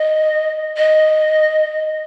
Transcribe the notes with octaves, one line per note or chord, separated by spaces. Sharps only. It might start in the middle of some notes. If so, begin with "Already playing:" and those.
Already playing: D#5
D#5